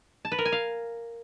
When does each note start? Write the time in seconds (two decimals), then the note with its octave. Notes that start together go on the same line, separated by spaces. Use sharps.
0.25 A5
0.32 B4
0.39 A#4
0.45 G#5
0.52 F5